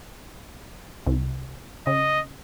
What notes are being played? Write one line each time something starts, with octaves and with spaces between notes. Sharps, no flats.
C2
C#3 D#5